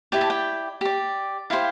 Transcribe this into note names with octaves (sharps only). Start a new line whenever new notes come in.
E4 G4 D5 G5
A5
G5
G4 D5
E4 G4 C5 F5